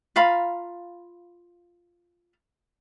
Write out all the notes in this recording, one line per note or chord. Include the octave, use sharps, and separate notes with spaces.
F4 F5 A#5 B5